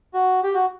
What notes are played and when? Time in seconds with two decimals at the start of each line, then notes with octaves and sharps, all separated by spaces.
0.14 F#4
0.43 G4
0.54 F#4